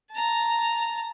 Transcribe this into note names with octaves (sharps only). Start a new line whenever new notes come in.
A5 A#5